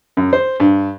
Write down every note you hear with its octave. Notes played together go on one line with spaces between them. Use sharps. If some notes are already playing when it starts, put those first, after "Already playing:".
F#2
C5
G2